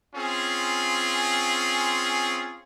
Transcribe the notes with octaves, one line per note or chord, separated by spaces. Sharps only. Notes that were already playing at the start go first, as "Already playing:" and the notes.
C4 C#4 F4 G#4